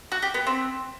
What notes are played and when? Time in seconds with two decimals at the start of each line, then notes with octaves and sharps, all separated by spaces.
0.12 F#4
0.22 G4
0.34 B3
0.47 C4